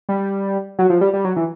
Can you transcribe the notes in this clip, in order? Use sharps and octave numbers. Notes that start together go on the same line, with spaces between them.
G3
F#3
F3
G3
G3
F#3
E3